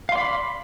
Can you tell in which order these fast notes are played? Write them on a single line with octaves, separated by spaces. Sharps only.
F5 C6 D5 B5